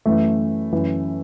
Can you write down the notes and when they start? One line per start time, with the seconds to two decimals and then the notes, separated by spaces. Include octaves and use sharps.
0.06 F#2 E3 A3
0.72 F#2 E3